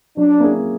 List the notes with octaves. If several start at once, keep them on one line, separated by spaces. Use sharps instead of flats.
F#3 D4
A#3 C#4 E4 G#4